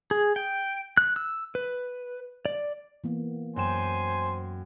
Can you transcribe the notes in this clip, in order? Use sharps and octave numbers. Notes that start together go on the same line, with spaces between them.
G#4
G5
F#6
E6
B4
D5
E3 A#3 B3
F#2 C5 G5 G#5 E7